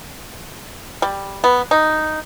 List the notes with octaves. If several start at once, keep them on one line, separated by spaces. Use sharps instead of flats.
G3
B3
D#4